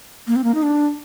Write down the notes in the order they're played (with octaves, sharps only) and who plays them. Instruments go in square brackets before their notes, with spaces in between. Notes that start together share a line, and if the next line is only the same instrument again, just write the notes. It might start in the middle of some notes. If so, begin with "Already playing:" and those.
[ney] A#3
C4
A#3
D#4
D4